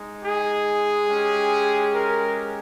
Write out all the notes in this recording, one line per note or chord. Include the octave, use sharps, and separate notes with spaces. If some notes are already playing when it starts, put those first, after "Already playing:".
Already playing: G#3 D#4
G#4
G#3 C#4 G4
A#4